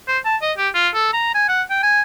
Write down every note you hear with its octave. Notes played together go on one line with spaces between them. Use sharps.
C5
A5
D#5
G4
F4
A4
A#5
G#5
F#5
G5
G#5